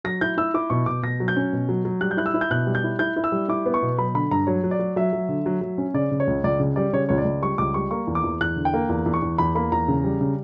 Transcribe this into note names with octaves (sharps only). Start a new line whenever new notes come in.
F#3 A#6
E4 G6
E4 E6
E4 D6
B2 C#6
B2 D6
B2 A#6
F#3
G6
C#4
B2
F#3
F#3
G3 F#6
G6
E4 F#6
E6
E4
G6
B2 F#6
G3
G6
E4
E4 G6
E4
E6
G3
E4 D6
B3
C#6
B2
F#3 B5
D3 B5
G2 A#5
F#3 C#5
F#3
D5
F#3
F#3 E5
F#3
D3
F#3
F#3
C#4
C#3 D5
C#3
C#5
C#2
C#2 D5
C#3
G3 D5
C#3 C#5
C#2 C#5
D5
C#2
G3 C#6
C#2 D6
G3 C#6
A#3 C#6
E2
D6
E2
E2 F#6
D3
G5
A#3
E2
E2
C#6
E2
E2 B5
A#3 B5
E2 A#5
C#3
G3
C#3